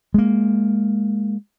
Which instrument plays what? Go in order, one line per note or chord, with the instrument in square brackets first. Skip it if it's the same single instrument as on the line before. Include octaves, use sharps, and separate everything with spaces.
[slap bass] G#3 A#3